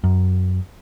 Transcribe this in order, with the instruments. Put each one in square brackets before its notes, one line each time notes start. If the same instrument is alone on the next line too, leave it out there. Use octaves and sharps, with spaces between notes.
[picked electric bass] F#2